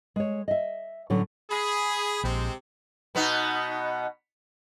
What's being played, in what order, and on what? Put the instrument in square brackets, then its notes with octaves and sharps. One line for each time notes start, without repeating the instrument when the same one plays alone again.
[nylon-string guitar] G#3 C#5
D#5 E5
A2 D3 F#3 C#4
[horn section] G#4 [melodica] B5
[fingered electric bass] A#1 [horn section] C3 G#3 C4
[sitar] B2 B3 D#4